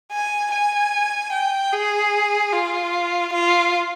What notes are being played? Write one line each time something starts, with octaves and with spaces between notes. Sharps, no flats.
G#5
G#5
G5
G#4
F4
F4